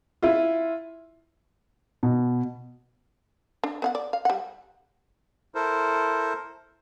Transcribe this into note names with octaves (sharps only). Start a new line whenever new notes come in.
E4 F4
B2
D4
B3 F5 F#5
D5
F5
G3 F#5
E4 A4 A#4 C5